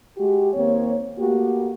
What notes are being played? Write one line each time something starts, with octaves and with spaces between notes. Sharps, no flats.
G#3 F#4 G4
D#2 A#3 C4 C#5
A3 A#3 F#4 G4